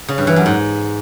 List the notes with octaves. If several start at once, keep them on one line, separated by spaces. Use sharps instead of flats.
C#3
G2
E3
F#2
G#2